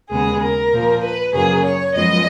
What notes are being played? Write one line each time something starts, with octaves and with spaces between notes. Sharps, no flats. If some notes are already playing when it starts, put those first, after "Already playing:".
D#2 C#3 G#3 B3 G#4
A#4
A#2 F3 A#3
B4
F#2 C#3 F#3 A#3 G#4
C#5
F#2 F3 G#3 B3 D#5